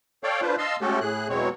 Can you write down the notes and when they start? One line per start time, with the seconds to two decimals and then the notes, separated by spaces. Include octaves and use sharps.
0.23 A4 C#5 D5 F5 G5
0.42 D4 F4 B4 C5
0.58 D#5 F5 A5 C6 E6
0.81 G#3 A3 C#4 F#4 G4 A4
1.01 A2 G#4 F#6
1.29 E2 B2 F#3 G#3 C4 C#5